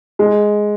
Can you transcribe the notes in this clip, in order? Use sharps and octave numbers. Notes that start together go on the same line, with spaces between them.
G#3